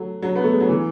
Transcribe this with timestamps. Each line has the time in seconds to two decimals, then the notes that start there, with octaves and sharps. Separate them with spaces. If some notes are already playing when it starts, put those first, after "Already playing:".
Already playing: F#3 A3
0.22 F#3
0.36 B3
0.44 A3
0.52 G#3
0.60 F#3
0.69 E3